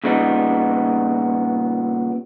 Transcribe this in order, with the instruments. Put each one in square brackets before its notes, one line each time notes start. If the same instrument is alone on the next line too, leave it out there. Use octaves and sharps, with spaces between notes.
[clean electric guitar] A#2 C#3 G3 B3 D#4